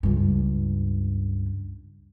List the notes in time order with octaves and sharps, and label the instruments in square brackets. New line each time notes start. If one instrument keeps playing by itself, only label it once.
[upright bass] C#2 G2